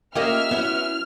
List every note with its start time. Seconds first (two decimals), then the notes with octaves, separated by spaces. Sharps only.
0.15 A#3 C#4 F4 G4 D#5 E5 F6
0.51 F#3 B3 C#4 E4